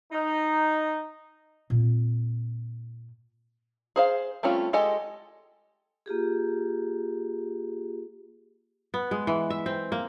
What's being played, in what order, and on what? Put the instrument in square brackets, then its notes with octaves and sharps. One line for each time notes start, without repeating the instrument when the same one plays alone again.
[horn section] D#4
[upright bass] A#2 C4
[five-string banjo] G#4 C5 F5
G3 A3 C4 C#4 F4
G#3 G4 A4 D#5 G#5
[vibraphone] A#3 F4 G4 G#4
[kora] B3
G#3
E3
E5
C4
A#3